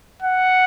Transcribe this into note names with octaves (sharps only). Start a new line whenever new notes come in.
F#5